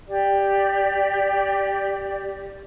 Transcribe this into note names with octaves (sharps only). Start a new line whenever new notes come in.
G4 D5